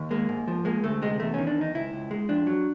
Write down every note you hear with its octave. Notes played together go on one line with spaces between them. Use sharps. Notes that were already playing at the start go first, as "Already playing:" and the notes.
Already playing: D#2
G#3 A#3
G#2
F3
G#3 A#3
D2 A3
C3 G#3
E2 A3
D#3 C#4
D4
E2 D#4
C#2 E4
C#2
G#3
F2 D4
F#3